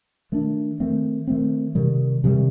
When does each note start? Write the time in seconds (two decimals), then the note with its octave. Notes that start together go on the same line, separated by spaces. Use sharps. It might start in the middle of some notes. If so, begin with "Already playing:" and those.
0.32 D#3 A3 D4
0.80 D#3 A3 C4
1.27 D#3 A3 C4
1.75 C3 D#3 G3
2.24 C3 D#3 G3